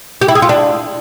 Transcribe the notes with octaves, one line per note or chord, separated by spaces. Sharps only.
G4
E4
G#4
F4
D4